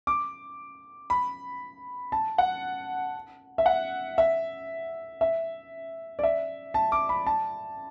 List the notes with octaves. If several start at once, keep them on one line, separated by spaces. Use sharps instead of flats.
D6
B5
A5
F#5
E5
F#5
E5
E5
D5
E5
A5
D6
B5
A5